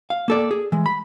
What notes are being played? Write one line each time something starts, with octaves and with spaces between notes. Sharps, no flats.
F5
A#3 A4 D5
G#4
E3 G#3
B5